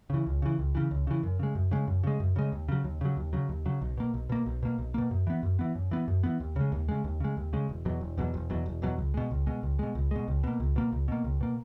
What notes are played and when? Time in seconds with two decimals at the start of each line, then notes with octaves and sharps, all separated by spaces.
0.10 C#3 E3
0.27 C#2
0.42 C#3 E3
0.59 C#2
0.75 C#3 E3
0.91 C#2
1.07 C#3 E3
1.23 F#2
1.39 C#3 G#3
1.55 F#2
1.71 C#3 G#3
1.87 F#2
2.03 C#3 G#3
2.20 F#2
2.36 C#3 G#3
2.52 D#2
2.68 C#3 F#3
2.84 D#2
3.01 C#3 F#3
3.17 D#2
3.33 C#3 F#3
3.49 D#2
3.66 C#3 F#3
3.81 B1
3.97 B2 A#3
4.14 B1
4.29 B2 A#3
4.46 B1
4.63 B2 A#3
4.78 B1
4.94 B2 A#3
5.11 F#2
5.27 E3 B3
5.43 F#2
5.59 E3 B3
5.75 F#2
5.91 E3 B3
6.08 F#2
6.23 E3 B3
6.40 D#2
6.56 C#3 G#3
6.72 D#2
6.89 C#3 G#3
7.04 D#2
7.20 C#3 G#3
7.37 D#2
7.53 C#3 G#3
7.69 E1
7.85 E2 B2 F#3
8.01 E1
8.18 E2 B2 F#3
8.34 E1
8.50 E2 B2 F#3
8.66 E1
8.82 E2 B2 F#3
8.98 C#2
9.14 B2 G#3
9.31 C#2
9.47 B2 G#3
9.63 C#2
9.79 B2 G#3
9.95 C#2
10.11 B2 G#3
10.28 C#2
10.44 B2 A#3
10.60 C#2
10.76 B2 A#3
10.92 C#2
11.08 B2 A#3
11.24 C#2
11.41 B2 A#3